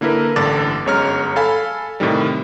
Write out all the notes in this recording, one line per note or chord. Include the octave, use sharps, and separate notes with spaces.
D3 A#3 E4 A#4 B4
A1 G2 D3 D6 A6
G1 F#2 G#3 C#5 A#5 F6
A4 F5 G#5 B5
A2 C3 D#3 G3